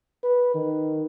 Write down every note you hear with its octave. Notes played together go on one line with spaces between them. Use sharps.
B4
D#3